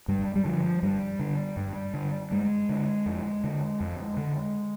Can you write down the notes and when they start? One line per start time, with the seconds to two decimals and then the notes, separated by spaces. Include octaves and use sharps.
0.08 G2 G3
0.35 G3
0.45 D3 F3
0.83 G2 G3
1.19 D3
1.57 G2
1.94 D3
2.31 G2 G#3
2.69 D3
3.06 F2
3.44 D3
3.80 F2
4.17 D3